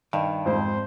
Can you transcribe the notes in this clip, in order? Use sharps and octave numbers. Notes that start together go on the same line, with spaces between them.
G2 D#3
F2 G#2 C4 C5